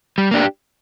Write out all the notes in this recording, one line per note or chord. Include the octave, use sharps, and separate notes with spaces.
G3
A#3 D4 G4